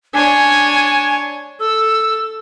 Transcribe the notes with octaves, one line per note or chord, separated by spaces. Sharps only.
D4 C#5 G#5
A4 E6